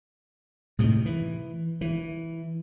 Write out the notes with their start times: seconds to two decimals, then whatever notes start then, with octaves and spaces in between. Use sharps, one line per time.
0.79 A2 C3 D#3
1.06 E3
1.81 E3